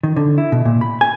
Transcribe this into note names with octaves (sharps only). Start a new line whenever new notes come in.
D#3
D3
E4
B2
A#2
B5
G#5